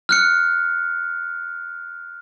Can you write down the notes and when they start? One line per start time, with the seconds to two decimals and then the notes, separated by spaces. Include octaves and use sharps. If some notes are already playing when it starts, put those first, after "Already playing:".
0.09 F6 F#6 C#7